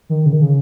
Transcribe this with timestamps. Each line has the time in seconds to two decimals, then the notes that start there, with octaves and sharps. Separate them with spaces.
0.09 D#3
0.26 C#3
0.32 D#3
0.41 C#3